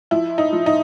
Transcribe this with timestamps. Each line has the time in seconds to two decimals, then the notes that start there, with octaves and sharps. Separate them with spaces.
0.11 F3 E4
0.38 D#4
0.53 F3
0.66 D#4